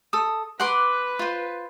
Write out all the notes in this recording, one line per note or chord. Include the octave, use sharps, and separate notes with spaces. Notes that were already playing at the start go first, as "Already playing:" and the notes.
A4 D#6
B4 F#5 C6 D6
F4 C5